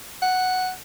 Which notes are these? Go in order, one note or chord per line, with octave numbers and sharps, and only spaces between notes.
F#5